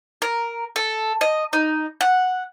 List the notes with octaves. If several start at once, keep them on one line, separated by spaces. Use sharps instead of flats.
A#4
A4
D#5
D#4
F#5